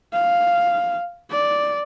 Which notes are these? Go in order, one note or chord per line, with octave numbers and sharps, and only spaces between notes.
F5
D5